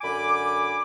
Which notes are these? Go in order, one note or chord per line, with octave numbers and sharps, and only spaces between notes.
F#2 D3 G#5 B5 D6